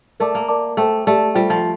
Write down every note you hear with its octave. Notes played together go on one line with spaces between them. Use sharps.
A3 A#4 D5 A5 D6
A#3
A#4 D5 A5 D6
A3 A4 C5 G5
A3 G4 D5 A5
G3 F4 A4 C5 G5
F3